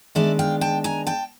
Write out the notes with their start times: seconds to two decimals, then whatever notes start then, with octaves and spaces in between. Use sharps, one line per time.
0.15 D#3 G#3 B3 D4 D5 E5
0.39 F5 G5
0.61 G5 A5
0.84 G#5 A#5
1.07 G5 A5